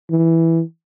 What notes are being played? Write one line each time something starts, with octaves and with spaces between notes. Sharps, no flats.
E3